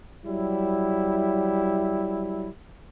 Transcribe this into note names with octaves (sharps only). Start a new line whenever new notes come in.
F#3 G3 E4